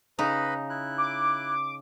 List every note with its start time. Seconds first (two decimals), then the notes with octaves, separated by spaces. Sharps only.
0.19 C#3 D#4 B4 D#5 B5
0.70 E4 F#6
0.98 D6